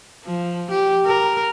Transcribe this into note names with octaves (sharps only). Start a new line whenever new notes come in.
F3
G4
A#4